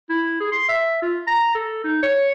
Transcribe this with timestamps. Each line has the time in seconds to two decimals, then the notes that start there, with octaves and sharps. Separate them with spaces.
0.10 E4
0.40 G#4
0.52 C6
0.69 E5
1.02 F4
1.27 A#5
1.55 A4
1.84 D#4
2.03 C#5